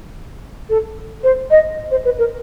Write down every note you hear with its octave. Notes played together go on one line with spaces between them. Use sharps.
A4
C5
D#5
C5
B4
A#4